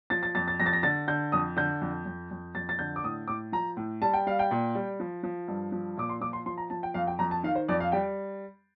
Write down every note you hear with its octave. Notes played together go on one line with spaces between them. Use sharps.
F3 A6
A6
F2 A6
A6
F2 A#6
A6
A#6
D3 A6
D3 G6
F2 D#6
D3 G6
F2
F2
F2
F2 A6
A6
D3 G6
D6
A2 D#6
A2 D6
F3 A#5
A2
G3 A5
G5
G3 F5
G5
A#2
G3
F3
F3
G2
F3
A#2 D6
C6
F3 D6
C6
F3 C6
A#5
F3 A5
G5
F2 F5
G5
F2 A#5
A5
D#3 F5
C5
F2 D5
F5
G3 G5